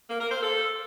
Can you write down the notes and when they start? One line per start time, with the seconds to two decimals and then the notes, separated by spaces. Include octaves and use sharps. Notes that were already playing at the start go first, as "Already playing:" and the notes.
0.09 A#3
0.20 A#4
0.31 C5
0.41 A4